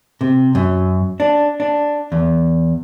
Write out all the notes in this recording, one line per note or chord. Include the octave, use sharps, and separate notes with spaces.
C3
F#2
D4
D4
E2